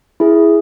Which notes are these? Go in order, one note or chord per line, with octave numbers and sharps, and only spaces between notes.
E4 G#4